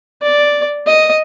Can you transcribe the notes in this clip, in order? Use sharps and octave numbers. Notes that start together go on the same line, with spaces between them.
D5
D#5